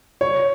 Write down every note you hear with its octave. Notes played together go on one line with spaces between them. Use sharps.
C#5